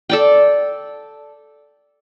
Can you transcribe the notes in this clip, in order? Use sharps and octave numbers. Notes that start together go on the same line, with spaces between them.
A4 D5 G5